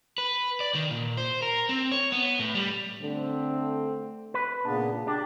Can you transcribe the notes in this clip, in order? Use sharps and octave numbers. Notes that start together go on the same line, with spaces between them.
B4
D5
D#3
A#2
C5
A#4
C4
C#5
B3
A2
G3
D3 A3 C4
B4
A#2 C#3 B3 D4
D4 G4